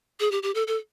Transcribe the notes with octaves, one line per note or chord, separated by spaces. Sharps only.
G#4
G4
G4
A4
A4